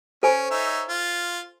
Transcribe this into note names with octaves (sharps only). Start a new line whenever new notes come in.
C#4 A4 C5 G#5
D#4 C#5 E5
F4